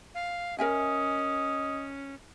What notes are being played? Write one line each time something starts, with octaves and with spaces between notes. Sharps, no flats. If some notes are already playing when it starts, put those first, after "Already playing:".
F5
C#4 A#4 D#5 E5 G#5